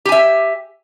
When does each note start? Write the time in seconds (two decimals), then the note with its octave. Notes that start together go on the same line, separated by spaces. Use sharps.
0.05 G4
0.09 G#5
0.12 E5